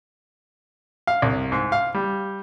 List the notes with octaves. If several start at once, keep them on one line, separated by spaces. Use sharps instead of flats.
F5
C2
G#2
F5
G3